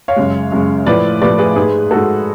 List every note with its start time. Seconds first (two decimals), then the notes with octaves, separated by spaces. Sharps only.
0.08 C#5 F5
0.16 F#2 C#3 G#3
0.52 F#2 C#3 G#3
0.86 A2 F3 A3 B4 D5
1.22 A2 F3 A3 B4 D5
1.38 G#4 B4
1.56 G#2 G#3 G#4 B4
1.91 G#2 G#3 F#4 A4